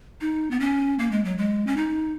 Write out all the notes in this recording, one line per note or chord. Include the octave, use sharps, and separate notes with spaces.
D#4
B3
C#4
A#3
G#3
F#3
G#3
C#4
D#4